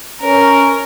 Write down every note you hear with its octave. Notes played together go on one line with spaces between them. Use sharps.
C#4 A#4